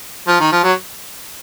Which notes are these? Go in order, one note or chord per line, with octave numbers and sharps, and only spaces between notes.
F3
D#3
F3
F#3